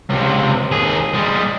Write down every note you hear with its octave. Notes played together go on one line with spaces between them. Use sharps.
C#2 C3
D#2 G#4
G3 G#3